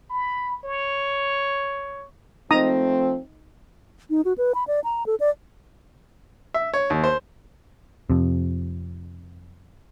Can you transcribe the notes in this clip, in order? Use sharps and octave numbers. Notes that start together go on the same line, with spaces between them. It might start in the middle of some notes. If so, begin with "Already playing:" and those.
B5
C#5
F3 A3 C4 D#4 A#5 D#6
D#4
F#4
B4
B5
D5
A#5
A4
D5
E5
C#5
D#2
C5
F2 C3